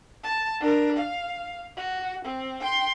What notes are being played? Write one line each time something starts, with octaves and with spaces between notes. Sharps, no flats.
A5
D4 A#4
F5
F#4
C4
G5 C6